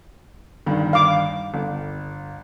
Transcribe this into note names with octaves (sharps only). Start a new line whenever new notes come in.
G1 G2 D#3
F5 D6
G1